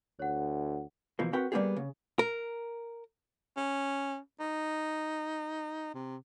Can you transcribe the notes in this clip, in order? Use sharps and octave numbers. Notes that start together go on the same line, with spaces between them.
D2 C#5 F#5
B2 E3 F3 A#3
C4 F#4 A#4 B4 F#5 G5
G3 A#3 B3 E4 G4 G#4
C#3
A#4
C#4
D#4
C3